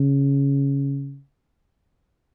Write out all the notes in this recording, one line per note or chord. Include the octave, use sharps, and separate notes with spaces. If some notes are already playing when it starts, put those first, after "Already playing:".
Already playing: C#3